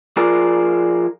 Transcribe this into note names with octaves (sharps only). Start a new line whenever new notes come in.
F3 F4 G#4 A#4 D5